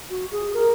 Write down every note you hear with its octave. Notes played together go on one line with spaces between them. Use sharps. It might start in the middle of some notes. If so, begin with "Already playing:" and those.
F#4
G#4
A#4